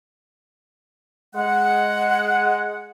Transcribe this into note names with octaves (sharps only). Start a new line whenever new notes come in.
G#3 F#5